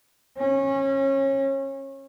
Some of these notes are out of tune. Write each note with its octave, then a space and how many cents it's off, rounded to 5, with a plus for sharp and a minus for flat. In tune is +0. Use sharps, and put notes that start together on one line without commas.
C#4 -25